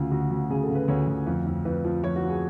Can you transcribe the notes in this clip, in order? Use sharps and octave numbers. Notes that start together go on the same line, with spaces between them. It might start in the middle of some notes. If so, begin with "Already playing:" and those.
Already playing: D2 C#3 F4
D2 F#4
D2
C#3 G#4
A4
C#3
B4
D2 C#5
D2
F2
F2
F2 B4
F3
F3 C#5
F#4
F3
G#4